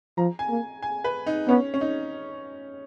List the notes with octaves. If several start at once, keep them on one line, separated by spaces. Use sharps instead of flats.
F3 A#5
G#5
A#3
G#5
B4
D#4
B3 C#4
C#4
D#4